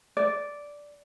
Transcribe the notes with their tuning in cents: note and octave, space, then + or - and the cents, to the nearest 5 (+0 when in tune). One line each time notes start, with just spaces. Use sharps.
D5 -5